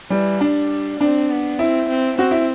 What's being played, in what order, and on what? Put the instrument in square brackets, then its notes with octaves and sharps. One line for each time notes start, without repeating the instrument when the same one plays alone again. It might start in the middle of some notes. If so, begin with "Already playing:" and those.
[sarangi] E3 [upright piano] G3
[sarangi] G3 [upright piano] D4
[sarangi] C4 [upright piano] D4
[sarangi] B3
[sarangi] C4 [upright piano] E4
[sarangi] C4
[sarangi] C4 [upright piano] F#4
[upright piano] E4